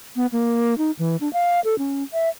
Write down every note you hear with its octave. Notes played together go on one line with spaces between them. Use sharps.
B3
A#3
D#4
E3
D4
F5
A4
C#4
E5